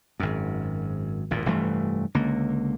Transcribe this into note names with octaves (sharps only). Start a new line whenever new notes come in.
G#1 F#2
G#1 E2 A#2
F1 G2 E3 A3
C#2 D3 A#3